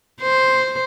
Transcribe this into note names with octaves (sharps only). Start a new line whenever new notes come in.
C5